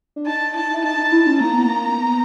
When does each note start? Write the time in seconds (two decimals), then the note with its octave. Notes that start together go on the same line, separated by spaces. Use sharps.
0.16 D4
0.26 D#4 A5
0.55 E4 A5
0.74 E4
0.84 D#4 A5
0.98 D#4
1.12 E4
1.27 C#4
1.41 A#3 A#5
1.53 B3
1.67 A#3
1.98 B3